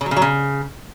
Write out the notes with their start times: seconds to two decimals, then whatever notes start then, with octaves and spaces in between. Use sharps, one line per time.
0.01 C#3
0.06 F#3
0.11 C#3
0.16 F#3
0.22 C#3